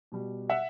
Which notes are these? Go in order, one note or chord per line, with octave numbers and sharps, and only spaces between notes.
B2 G3
E5 F#5